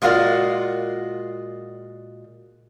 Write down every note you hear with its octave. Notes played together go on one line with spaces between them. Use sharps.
A#2 G#3 F4 F#4 A#4 D5